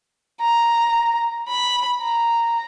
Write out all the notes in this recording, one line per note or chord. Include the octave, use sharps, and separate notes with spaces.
A#5
B5
A#5